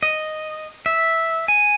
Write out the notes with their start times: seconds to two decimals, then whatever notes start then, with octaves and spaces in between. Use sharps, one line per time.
0.03 D#5
0.86 E5
1.48 G#5